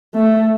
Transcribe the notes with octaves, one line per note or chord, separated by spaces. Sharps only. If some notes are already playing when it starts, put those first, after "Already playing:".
A3